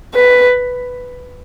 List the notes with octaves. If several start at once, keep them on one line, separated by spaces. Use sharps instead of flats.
B4